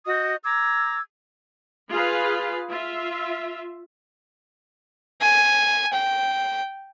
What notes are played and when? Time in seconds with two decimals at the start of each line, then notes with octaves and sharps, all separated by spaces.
0.06 F#4 D#5 D#6 G6
0.44 A#5 D6 E6 G#6
1.91 F4 G#4 B4 F5
2.67 F4 E5
5.21 G#5
5.93 G5